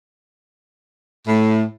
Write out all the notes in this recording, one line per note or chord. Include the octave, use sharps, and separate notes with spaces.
A2